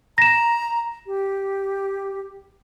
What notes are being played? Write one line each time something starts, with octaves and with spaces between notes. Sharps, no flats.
A#5 A#6 E7
G4